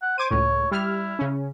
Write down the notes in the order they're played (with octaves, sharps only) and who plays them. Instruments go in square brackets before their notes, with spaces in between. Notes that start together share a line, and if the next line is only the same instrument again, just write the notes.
[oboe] F#5
[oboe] C5 [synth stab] D6 G#6 D#7
[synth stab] C#2 A2 [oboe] C#5
[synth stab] G3 F6 [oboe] E4
[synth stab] C#3 C#4